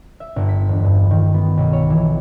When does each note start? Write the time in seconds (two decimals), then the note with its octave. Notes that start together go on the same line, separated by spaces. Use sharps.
0.20 E5
0.36 G1
0.48 B6
0.69 E1
0.84 G2
1.10 D#3
1.34 B3
1.57 B1
1.73 C#5
1.90 E3